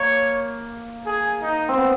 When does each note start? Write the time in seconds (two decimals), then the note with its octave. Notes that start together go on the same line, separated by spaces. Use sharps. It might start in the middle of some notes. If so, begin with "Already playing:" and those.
Already playing: A#3 C#5
1.06 G#4
1.42 D#4
1.69 C4
1.78 B3